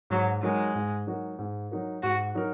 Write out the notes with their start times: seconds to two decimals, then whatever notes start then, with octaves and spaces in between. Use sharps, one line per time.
0.10 G#2 F#3
0.42 F#3 G#3 D#4 F#4 A#4
0.75 G#2
1.07 F#3 D#4 F#4 A#4
1.39 G#2
1.71 F#3 D#4 F#4 A#4
2.03 G#2 F#4
2.35 F#3 D#4 F#4 A#4